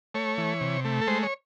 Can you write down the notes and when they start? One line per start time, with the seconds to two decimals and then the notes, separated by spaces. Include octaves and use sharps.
0.14 A3 C#5
0.38 E3
0.61 C3
0.85 A3
1.02 A4
1.07 G#3 C5
1.23 C#5